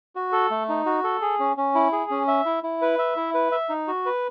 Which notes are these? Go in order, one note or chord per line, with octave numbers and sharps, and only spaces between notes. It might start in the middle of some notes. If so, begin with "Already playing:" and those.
F#4
A4
A3
D#4
F#4
A4
G#4
C#4
C#4
E4
G#4
C#4
E5
E4
E4
B4
E5
E4
B4
E5
D#4
F#4
B4